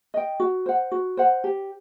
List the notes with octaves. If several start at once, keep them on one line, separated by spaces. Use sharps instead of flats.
D#5 G5
F#4
C5 F#5
F#4
C5 F#5
G4